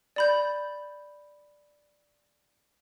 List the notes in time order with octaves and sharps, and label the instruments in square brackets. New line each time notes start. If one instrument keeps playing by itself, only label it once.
[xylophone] D5 B5 G6